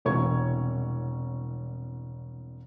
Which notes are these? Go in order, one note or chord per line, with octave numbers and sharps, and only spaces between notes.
E1 C2 C#5 C#6 G#6